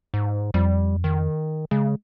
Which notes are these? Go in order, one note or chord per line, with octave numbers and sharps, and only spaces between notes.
G#2
F2 G3
D#3
C#3 G#3